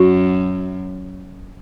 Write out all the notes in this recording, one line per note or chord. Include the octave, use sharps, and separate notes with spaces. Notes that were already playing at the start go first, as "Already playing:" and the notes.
Already playing: F#2 F#4